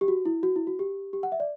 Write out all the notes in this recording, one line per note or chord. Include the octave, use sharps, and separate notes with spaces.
G4
F#4
E4
F#4
E4
F#4
G4
G4
F#5
E5
D5